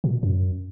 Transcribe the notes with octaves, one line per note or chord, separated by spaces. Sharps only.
A#2
F#2